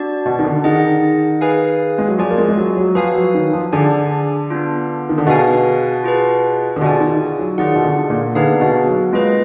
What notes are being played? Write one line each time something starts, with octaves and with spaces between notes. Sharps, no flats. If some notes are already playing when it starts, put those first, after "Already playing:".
Already playing: D4 F#4 D5
B2
D#3
D3
D#3 G#4 D#5 F#5
G#4 B4 F5 G#5
G#3
F#3
F3 F4 G#4 D5 G#5
A#3
G#3
G#3
F#3
F#3
F3 F#4 B4 F5 G#5
F#3
D#3
F3
D3 D4 G#4 D5 G#5
B3 D4 F4
D#3
D3
B2 G#4 B4 F5 G#5
F4 G#4 B4
D3
B2 F4 G#4 D5 G#5
D#3
F#3
D#3 F4 G#4 D5 F#5
B2
D3
A#2
D3 B3 D#4 G#4 B4 F5
B2
F#3
G#3 A#3 F4 B4 D#5